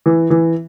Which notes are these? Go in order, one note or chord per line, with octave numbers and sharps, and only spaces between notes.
E3
E3